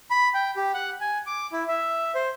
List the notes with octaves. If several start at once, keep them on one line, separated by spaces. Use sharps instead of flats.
B5
G5
G4
F#5
G#5
D6
E4
E5
C5